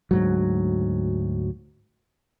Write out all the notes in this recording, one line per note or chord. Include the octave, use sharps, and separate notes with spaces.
D2 G#2 F#3